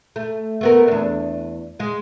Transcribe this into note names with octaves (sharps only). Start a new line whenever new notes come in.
A3
A3 B3 A#4
E2 D4
G#3 G#4